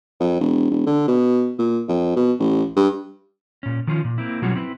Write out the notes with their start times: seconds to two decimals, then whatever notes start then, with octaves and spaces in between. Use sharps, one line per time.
0.20 F2
0.41 E1
0.71 E1
0.86 D3
1.08 B2
1.58 A#2
1.88 F2
2.16 B2
2.40 A1
2.76 G2
3.63 A#2 C#4
3.87 D#3 F3 C#4 F4
4.04 A#2
4.18 A#3 C4 E4
4.42 B2 F#3 G3 C#4 F4 F#4
4.56 C4 E4 B4